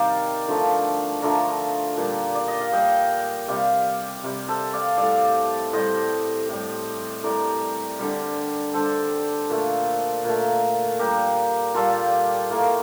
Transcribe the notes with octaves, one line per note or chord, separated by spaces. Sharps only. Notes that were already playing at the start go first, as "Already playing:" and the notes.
Already playing: C3 D#3 G3 D5 F5 G5
D3 F3 A3
D3 F3 A3 A#4 D5
A#2 G3
D5
D#5
F5
A#2 G3 D#5 G5
C3 G3 D5 F5
C3 G3
A4 C5
D5 F5
A2 G3 D5 F5
A2 G3 C5 D#5
A2 G3
A2 G3 A#4 D5
D3 G3
D3 G3 A4 C5
A#2 A3
A#2 A3
A#2 G3 G4 A#4
A#2 G3 F4 A4
A2 A3 A#3